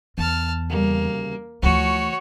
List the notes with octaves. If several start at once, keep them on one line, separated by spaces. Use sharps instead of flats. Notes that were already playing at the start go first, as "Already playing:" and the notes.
E2 A5 F6
D2 C#3 G3 A#3
D2 E3 F3 F#4 C#5